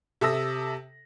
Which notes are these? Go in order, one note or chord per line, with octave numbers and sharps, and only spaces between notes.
C3 A4 E5 D#6 E6 A#6